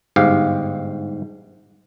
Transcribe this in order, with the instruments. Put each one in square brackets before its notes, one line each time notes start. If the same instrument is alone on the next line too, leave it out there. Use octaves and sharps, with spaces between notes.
[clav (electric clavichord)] G1 G#2 G4 F5